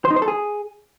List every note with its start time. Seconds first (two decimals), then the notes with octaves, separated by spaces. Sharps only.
0.05 C5
0.10 D#4
0.16 C5
0.22 A4
0.28 G#4